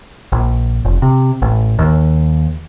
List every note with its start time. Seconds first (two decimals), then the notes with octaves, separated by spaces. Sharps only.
0.32 A#1
0.85 F1
1.02 C3
1.42 A1
1.79 D#2